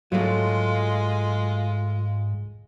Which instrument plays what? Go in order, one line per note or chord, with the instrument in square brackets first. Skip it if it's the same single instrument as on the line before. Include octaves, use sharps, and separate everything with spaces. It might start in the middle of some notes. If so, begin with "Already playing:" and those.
[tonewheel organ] G#2 [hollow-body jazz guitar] F#3 A3 [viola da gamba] G#3 [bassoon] F4